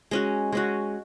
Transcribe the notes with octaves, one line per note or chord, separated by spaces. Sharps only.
G#3 C#4 F#4
G#3 C#4 F#4